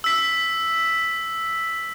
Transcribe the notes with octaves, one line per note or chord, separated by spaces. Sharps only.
E6 B6